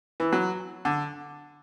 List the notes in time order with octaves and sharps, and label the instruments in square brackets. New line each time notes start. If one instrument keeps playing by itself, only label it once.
[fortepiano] E3
F#3
D3